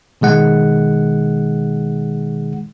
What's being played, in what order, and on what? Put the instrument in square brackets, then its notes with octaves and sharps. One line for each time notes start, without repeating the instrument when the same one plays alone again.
[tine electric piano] B2 D#3 G#3 F#5